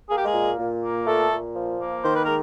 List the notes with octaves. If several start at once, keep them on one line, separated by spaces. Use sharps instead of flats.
A#3 G#4
G4
G#3 G#4
A#2
A#2
A#3
A#2 A3 A4
A#2
F3
A#3
D#3 C5
B4
G#3 A#4